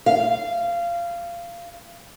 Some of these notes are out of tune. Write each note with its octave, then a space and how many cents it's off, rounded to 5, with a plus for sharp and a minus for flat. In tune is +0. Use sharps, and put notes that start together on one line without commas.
F5 -20